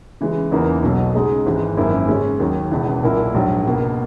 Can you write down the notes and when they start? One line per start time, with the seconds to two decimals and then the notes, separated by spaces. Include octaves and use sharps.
0.21 C#3 E3 G#3
0.51 E2 C#3 E3 A#3 D#4
0.83 B1 B2 F#3
1.15 C#3 G#3 D#4 G#4
1.46 G#1 G#2 E3 G#3
1.77 G#1 F#2 E3 A#3 E4
2.09 C#3 G#3 C#4
2.40 D#2 D#3 F#3
2.71 E1 E2 C#3 E3
3.03 B1 A#2 A#3 E4 A#4
3.34 A#1 G#2 F#3
3.66 C#2 B2 A#3